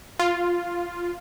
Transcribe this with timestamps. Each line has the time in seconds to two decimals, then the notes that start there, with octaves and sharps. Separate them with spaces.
0.19 F4